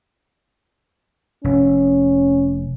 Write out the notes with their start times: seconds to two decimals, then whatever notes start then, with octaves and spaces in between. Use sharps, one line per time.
1.44 F1 C#4